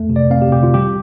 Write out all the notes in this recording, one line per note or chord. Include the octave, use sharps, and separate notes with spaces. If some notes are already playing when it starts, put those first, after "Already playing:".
Already playing: F2 A3
C3
D5
C4 F5
G4
C3 G4
F4
G3 G4